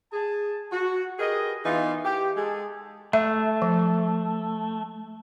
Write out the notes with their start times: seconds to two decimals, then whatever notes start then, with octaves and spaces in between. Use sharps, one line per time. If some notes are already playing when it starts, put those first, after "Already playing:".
0.13 G#4 A5
0.72 F#4
1.19 G4 G#4 A#4 B4 D#5
1.65 E3 B3 D#4 F4
2.05 G4
2.37 G#3 G#4 A4
3.13 A3 E5
3.62 F3